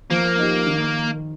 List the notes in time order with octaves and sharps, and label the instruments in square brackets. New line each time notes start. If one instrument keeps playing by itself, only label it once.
[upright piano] F3 [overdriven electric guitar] A#3
[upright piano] D#4 G4
D#3